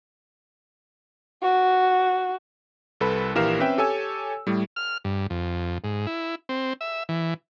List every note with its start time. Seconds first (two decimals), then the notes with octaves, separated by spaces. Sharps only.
1.43 F#4
3.00 C2 A4 B4 B5
3.35 A#1 E3 G4 A#4 F5 E7
3.59 C4 C#4 B4 E5 G5
3.78 G4 A4 C#5 G#5 E6
4.47 A2 G3
4.76 F6
5.04 G2
5.30 F2
5.84 G#2
6.07 E4
6.49 C4
6.81 E5
7.09 E3